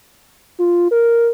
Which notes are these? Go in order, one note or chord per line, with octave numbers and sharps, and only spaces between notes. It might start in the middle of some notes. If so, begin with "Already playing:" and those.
F4
A#4